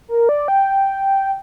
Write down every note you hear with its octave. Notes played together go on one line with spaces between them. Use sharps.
A#4
D5
G5